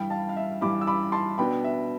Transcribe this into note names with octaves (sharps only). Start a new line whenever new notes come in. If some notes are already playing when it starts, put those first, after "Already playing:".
Already playing: G2 E3 G3 G5 B5
F5 A5
F5
E5
G2 E3 G3 B5 D6
E6
B5 D6
A5 C6
B2 B3 D4 G5 B5
E5